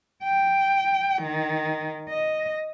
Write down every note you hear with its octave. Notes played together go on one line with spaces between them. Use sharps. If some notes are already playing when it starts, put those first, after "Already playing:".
G5
D#3
D#5